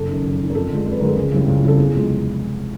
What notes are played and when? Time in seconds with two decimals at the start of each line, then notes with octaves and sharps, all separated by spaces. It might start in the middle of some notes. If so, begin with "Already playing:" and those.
Already playing: F#1 A4
0.09 F#2 D#3
0.24 F#1
0.39 F#2 D#3
0.50 A#4
0.55 F2 A4
0.70 D3 F3 G#3
0.86 F2
0.92 B4
1.00 D3 F3 G#3 A#4
1.08 A4
1.16 C#2 G#4
1.32 C#3 E3 G3 C4
1.47 C#2
1.63 C#3 E3 G3 C4 A4
1.78 E2 G#4
1.94 C3 F3 G#3 C4